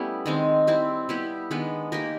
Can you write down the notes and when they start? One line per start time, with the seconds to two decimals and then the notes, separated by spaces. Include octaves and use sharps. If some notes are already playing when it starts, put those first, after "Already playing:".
Already playing: G3 A3 B3 C#4 E4
0.26 D#3 G#3 C4
0.67 G3 C4 E4
1.09 G3 B3 E4 G4
1.51 D#3 G#3 B3 D4
1.92 A#3 D#4 G4 A#4